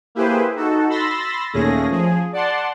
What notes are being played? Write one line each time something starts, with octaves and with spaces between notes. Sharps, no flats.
A#3 E4 G4 G#4 B4 C5
D#4 F#4 A4
B5 C6 E6 A6 A#6
D#2 A#2 A3 C#4 G#4 A#6
F3 G#4
D5 F#5 A5 C6